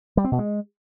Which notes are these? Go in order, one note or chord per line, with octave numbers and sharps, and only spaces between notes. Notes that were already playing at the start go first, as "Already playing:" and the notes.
G3
C4
B2
G#3